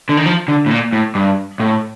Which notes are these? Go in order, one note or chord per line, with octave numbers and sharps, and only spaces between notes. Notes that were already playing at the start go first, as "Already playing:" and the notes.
D3
D#3
F3
D3
A2
A#2
A2
G2
A2